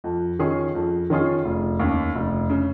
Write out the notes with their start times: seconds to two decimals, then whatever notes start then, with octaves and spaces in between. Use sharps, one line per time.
0.04 F2
0.39 D#3 C#4 F4 G#4
0.75 F2
1.10 D#3 C#4 F4 G#4
1.45 F1
1.79 D#2 C#3
2.15 F1
2.50 C#3